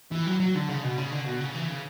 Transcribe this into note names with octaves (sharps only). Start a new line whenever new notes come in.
E3
F#3
F#3
D3
C#3
B2
C#3
D3
B2
C#3
E3
C#3